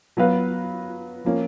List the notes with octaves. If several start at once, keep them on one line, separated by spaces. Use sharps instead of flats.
F#3 B3 F#4 B4 F5
F3 A#3 C#4